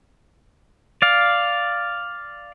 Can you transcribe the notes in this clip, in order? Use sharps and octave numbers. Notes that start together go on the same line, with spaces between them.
D5 F5